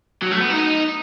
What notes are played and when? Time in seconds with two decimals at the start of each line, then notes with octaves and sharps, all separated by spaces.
0.22 F#3
0.31 A3
0.40 B3
0.50 D#4